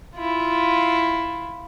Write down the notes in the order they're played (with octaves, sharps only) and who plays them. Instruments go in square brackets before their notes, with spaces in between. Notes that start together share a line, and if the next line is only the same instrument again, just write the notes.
[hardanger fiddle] E4 F4